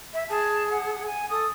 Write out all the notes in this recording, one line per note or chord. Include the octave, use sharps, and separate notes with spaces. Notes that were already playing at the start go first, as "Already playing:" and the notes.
E5
G#4 A5
F#5
G#5
A4 D#6